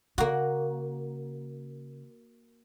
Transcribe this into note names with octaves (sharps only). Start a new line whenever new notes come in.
C#3 A#3 F#4